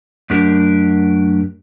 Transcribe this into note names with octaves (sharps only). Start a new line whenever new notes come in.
F#2 A3 D4 G4 A#4